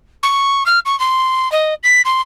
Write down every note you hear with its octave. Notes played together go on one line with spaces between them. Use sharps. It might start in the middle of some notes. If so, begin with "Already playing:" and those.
C#6
F6
C#6
C6
D#5
B6
C6